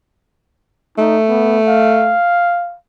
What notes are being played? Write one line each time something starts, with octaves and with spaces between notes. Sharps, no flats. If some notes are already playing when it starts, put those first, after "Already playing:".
A3 D#4
B3
F5